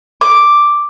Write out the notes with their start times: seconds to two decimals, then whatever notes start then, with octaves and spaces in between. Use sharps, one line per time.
0.21 D6